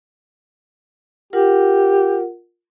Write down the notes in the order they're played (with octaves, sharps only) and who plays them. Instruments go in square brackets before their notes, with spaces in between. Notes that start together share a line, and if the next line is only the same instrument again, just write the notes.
[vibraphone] F4 A#4 F#5 [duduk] G4